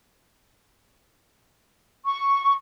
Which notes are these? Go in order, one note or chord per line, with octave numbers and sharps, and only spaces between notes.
C#6